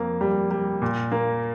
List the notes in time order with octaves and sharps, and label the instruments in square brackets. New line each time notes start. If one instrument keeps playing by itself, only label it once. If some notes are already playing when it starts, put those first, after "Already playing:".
Already playing: [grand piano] F2 A#3
G3
G3
A#2
A#3